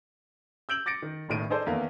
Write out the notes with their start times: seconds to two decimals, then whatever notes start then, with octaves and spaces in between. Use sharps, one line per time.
0.69 E6 G6 D7 F#7
0.86 D6 A6 A#6 C#7 D7
1.02 D#3
1.28 E1 A1 A2 D#3 D7 D#7
1.50 D#4 G#4 A4 C5 D5 D#5
1.66 E2 D#3 A3 A#3